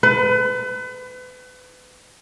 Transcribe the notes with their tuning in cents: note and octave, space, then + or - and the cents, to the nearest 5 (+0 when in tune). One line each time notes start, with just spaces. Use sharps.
B4 +35